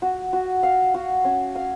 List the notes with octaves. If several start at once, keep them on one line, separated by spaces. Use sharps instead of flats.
F#4
F#4
F5
F#4
C#4
F5